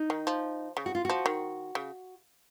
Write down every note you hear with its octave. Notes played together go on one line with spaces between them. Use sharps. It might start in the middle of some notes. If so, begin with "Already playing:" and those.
Already playing: D#4
D#3
F3
C#3
F#4
F4
F3 F#4
D#3
C#3